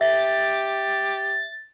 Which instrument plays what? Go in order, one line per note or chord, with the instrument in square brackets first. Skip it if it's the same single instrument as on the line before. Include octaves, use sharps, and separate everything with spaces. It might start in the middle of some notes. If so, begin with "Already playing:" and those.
[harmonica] G4 [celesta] E5 [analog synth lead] A6